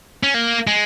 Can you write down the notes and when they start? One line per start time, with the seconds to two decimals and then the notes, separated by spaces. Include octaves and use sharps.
0.23 C#4
0.34 A#3
0.67 G#3